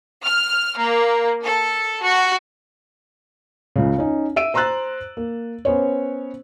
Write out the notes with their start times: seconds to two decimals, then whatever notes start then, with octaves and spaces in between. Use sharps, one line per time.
0.23 F6
0.78 A#3
1.43 A4
2.03 F#4
3.76 C#2 C#3
3.98 C#4 D#4
4.36 E5 E6 D7 D#7
4.54 C5 A#5 C6 E6 F#6 A6
5.17 A#3
5.65 B3 C#4 C5 C#5